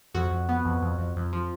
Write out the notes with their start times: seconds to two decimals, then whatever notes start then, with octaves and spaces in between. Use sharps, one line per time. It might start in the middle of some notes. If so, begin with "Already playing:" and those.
0.14 F2 F#4
0.31 F2
0.49 B3
0.65 F2
0.82 F2
0.98 F2
1.16 F2
1.33 F3